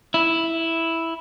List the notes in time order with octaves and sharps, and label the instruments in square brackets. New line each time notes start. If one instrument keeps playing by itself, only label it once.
[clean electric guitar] E4